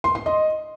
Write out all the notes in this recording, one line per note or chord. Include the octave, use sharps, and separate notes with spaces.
C6
C6
D#5